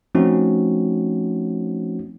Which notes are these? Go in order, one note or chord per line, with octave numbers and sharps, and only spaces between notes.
F3 A3 C4 C#4 D#4 F#4